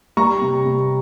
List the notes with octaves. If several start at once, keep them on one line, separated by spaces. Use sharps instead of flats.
G3 A#5 C#6
C3
C3